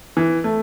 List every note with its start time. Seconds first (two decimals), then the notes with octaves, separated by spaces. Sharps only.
0.17 E3
0.44 A3